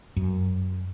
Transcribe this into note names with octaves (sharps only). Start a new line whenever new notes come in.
F#2